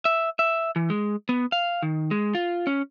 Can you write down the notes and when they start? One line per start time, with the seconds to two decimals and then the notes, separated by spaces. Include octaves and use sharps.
0.05 E5
0.39 E5
0.76 E3
0.90 G#3
1.29 B3
1.52 F5
1.82 D#3
2.11 G#3
2.35 F4
2.67 C#4